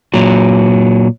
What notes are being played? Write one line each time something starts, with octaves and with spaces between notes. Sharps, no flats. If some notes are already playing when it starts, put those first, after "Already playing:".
A#2 F#3